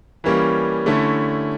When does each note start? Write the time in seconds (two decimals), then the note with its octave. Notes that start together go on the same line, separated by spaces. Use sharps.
0.24 E3 G3 A#3 C#4
0.86 D3 A3 C#4 E4